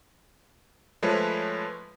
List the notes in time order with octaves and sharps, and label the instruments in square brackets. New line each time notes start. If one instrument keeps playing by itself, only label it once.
[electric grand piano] F3 G#3 A3 B4 C#5